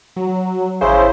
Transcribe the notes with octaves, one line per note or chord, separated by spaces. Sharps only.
F#3
G#1 C#3 E4 C5